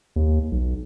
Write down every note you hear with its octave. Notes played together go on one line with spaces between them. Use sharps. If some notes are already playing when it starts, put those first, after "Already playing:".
D#2
B1